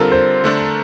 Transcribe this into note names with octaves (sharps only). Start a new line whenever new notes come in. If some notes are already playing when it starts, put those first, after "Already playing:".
Already playing: D3 G3 C4 F4 A4 A#4
C5
D3 A3 D4 A4